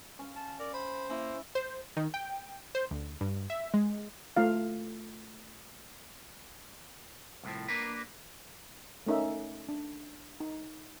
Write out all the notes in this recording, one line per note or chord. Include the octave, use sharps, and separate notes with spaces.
C#4 F5
A5
A#4 D5
C5 B5
A#3 C#4 E4
C5
D#3
G5
C5
D2
G2
E5
G#3
A3 F4 F5
C2 A2 F3
A#3 D4 A#4 B4
A3 C#4 D#4 A#4 E5
D4
D#4